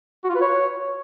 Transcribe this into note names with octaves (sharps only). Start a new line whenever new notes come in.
F#4
F4
B4
C#5